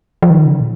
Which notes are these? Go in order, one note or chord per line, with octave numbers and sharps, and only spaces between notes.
F3
D#3
C#3
A#2